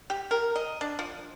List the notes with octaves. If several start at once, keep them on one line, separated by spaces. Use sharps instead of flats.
G4
A#4
D#5
D4
F3